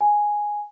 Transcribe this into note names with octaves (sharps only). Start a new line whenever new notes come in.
G#5